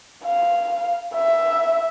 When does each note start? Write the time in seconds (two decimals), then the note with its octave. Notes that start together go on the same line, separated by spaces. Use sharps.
0.25 F5
1.15 E5